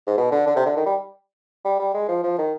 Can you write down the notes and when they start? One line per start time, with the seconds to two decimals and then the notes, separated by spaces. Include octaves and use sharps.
0.07 G#2
0.18 B2
0.32 D3
0.47 D3
0.56 C3
0.66 D3
0.77 D#3
0.86 G3
1.65 G3
1.80 G3
1.94 G#3
2.08 F3
2.23 F3
2.38 D#3